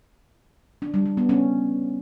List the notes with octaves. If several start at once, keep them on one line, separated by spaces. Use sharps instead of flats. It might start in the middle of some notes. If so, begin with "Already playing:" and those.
D4
G3
G3
B3
C#4